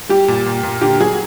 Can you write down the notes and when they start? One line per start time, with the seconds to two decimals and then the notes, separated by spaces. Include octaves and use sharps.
0.09 G3 G4
0.28 A#2
0.46 A#2
0.63 A#2
0.81 D3 G4
1.00 F#3 G#4